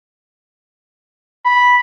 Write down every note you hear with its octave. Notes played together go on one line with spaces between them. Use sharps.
B5